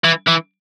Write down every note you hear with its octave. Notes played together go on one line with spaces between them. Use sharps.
E3
E3